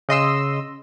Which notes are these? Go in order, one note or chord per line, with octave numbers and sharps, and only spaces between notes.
C#3 D#5 C6 E6